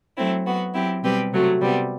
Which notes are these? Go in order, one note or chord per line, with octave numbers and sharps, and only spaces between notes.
F#3 A3 C4 E4
F#3 B3 F#4
F#3 C4 E4 G4
B2 G3 C4 G4 B4
C3 F#3 A3
C3 G3 B3